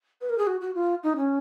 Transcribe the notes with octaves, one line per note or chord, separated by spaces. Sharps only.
B4
A#4
G#4
F#4
F#4
F4
D#4
C#4